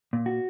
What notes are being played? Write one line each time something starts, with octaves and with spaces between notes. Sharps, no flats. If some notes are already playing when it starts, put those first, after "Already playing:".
A#2
F#4